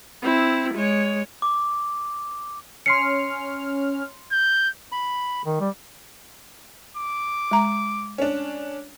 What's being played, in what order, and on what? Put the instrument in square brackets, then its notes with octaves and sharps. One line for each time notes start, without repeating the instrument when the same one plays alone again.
[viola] C4 E4
G#3 C#5
[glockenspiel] D6
[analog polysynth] C#4 F6 [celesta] C6 C7 C#7
[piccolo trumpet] G6
[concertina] B5
[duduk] D#3
G3
[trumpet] D6
[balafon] G#3 A#5
[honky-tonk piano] C#4 D4